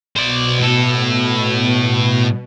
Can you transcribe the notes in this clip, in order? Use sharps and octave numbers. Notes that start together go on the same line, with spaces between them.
B2 C5 D5
A2 A4